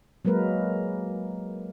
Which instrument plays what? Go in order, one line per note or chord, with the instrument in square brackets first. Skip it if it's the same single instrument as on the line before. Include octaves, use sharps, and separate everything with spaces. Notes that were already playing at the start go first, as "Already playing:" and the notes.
[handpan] F#3 G#3 A#3 A#4 B4